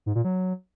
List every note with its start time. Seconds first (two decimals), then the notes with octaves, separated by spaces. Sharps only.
0.06 G#2
0.15 A#2
0.25 F#3